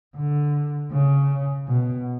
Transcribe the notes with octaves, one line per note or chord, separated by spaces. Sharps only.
D3
C#3
B2